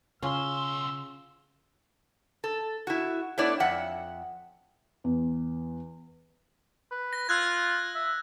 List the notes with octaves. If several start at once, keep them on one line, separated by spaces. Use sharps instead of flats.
B1 C#3 C#4 F4 C6 E6
A4
E4 F#4
A3 B3 D4 E4 C#5 D5
F2 E5 F#5
E2
B4
A#6
F4 E6 F#6 G#6
E5